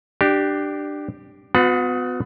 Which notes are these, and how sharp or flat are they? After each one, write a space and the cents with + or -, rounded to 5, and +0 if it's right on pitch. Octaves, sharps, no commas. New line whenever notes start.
D4 +15 G4 -10
B3 +30 F#4 -40 F#5 +0